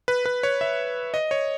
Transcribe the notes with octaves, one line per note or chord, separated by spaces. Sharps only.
B4
B4
C#5
E5
D#5
C#5